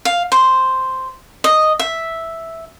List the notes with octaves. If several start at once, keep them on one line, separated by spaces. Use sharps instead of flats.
F5
C5
D#5
E5